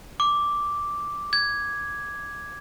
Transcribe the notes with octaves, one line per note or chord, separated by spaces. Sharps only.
D6
G#6